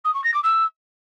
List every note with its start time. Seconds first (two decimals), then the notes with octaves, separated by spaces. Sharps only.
0.04 D#6
0.14 C#6
0.24 A#6
0.34 D6
0.43 E6